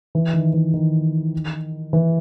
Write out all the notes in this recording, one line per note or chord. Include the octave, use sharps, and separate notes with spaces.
E3
D#3
E3
D#3
E3